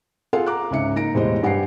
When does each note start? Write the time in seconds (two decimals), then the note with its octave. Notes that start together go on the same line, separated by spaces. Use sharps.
0.33 F4 G#4 A4 F5 F#5
0.46 A#5 D6 F#6
0.71 C#2 G#2 C#4 E5 C#7
0.95 A#3 D#4 A#6 D7
1.14 E1 A2 G#3 G4 C5 D#5
1.43 G2 G4 F#5 G#5 C7